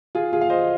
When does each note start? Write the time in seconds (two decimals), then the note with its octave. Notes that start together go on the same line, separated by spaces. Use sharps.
0.15 F4 G#4
0.33 F4 G#4
0.41 F5
0.50 C5 D#5